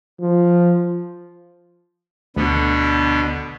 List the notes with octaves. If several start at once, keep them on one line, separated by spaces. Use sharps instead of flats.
F3
D2 B2 D3 B3